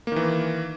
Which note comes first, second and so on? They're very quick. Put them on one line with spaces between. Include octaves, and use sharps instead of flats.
A#3 D#3 E3